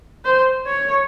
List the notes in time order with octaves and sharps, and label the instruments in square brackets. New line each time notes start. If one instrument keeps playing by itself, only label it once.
[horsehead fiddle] C5
C#5